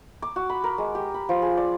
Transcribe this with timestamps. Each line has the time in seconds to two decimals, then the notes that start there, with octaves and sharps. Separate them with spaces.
0.22 D6
0.36 F#4
0.49 B5
0.64 A#4
0.78 G#3
0.95 G4
1.14 B5
1.29 F3
1.42 G#4
1.57 D5